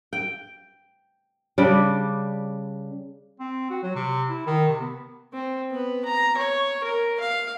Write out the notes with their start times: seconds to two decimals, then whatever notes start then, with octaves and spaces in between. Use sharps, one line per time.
0.13 G5
1.58 C#3 G3 D4
3.40 C4
3.70 F#4
3.83 F#3
3.96 C3
4.29 E4
4.46 D#3
4.68 C3
4.81 B3
5.33 C4
5.70 B3 B4
6.05 A#5
6.37 C#5
6.84 A#4
7.20 F5